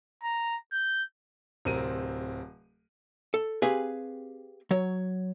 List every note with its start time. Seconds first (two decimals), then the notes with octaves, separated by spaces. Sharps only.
0.23 A#5
0.72 G6
1.65 D1 C3 C4 A#4 D#7
3.34 A4
3.62 C4 G4 G#4 B4 F5 G#5
4.71 F#3 C#5